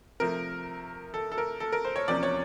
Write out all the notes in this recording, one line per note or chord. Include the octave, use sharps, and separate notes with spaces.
C3 F3 A3 A#4
A4
A4
A#4
A4
A#4
C5
C#5
E2 C3 F3 A#3 C#4 D5
C#5